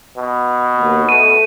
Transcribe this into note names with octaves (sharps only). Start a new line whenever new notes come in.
B2
D#2
A3 D#7